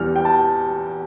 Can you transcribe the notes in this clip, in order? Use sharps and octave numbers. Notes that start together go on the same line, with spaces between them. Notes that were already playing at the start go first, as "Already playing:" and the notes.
Already playing: E2 E3 G3 F6
G5
A5